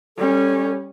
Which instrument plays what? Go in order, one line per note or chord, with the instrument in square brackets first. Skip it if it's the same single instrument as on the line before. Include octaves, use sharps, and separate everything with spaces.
[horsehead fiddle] G3 C#4 [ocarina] A4